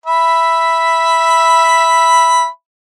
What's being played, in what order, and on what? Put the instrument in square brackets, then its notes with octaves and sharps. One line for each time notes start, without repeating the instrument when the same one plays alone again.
[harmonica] E5 B5